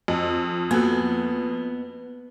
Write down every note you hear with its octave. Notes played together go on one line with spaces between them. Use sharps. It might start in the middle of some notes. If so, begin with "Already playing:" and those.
F2
A#3 B3 F#4 A4